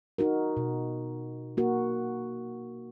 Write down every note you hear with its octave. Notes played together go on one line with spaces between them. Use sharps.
D#4 F#4 A#4
B2
A#3 F#4 A#4